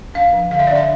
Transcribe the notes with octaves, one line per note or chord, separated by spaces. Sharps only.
D4 F5
F3
D3 F5
E5
D5
D4 E5